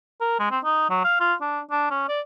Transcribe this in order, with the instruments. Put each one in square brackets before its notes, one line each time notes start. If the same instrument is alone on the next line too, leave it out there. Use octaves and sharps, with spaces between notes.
[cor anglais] A#4
G#3
C4
D#4
F#3
F5
F4
D4
D4
C#4
D5